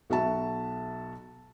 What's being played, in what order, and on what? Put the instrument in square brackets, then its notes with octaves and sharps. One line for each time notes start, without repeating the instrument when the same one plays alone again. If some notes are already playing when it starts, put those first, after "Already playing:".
[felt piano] B1 F#4 E5 A5